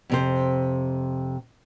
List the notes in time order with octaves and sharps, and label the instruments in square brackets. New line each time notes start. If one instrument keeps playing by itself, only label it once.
[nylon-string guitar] F2 C3 C5